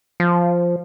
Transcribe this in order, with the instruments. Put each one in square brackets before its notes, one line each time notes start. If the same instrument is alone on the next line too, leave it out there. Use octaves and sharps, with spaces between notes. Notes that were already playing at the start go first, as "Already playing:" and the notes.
[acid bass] F3